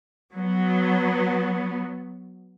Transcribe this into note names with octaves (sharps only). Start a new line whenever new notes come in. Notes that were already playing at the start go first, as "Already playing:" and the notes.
F#3 B3